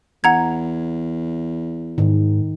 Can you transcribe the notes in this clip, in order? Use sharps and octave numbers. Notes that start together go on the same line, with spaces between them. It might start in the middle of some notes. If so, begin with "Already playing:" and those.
E2 F#5 A#5 G#6
G#2 D#3